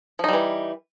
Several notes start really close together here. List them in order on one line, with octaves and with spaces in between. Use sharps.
F3 D#4 G3 E3